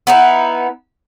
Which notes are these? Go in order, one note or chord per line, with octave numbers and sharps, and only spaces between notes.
B3 D#4 E4